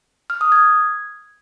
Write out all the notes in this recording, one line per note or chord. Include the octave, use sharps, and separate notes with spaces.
F6
D#6
G#6